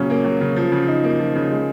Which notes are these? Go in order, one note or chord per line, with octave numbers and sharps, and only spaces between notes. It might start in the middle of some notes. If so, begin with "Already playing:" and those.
Already playing: A#2 C#3 F#3 C#4
A#3
F#3
C#3
F3
C#3
D#4
A#3
F3
C#3
G#3